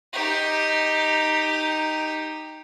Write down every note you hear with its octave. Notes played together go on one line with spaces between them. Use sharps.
D#4 G4